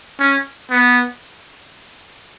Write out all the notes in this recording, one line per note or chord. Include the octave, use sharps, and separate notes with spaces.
C#4
B3